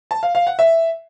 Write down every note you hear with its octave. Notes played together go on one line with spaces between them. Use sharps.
A5
F5
F5
F#5
E5